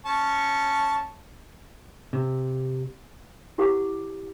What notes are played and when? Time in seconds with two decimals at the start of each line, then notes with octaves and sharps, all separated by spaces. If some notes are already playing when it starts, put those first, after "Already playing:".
0.06 C#4 A5 C#6
2.13 C3
3.58 E4 G4 B4 F#5 D6